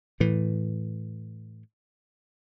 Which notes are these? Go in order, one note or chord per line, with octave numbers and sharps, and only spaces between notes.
A2 E3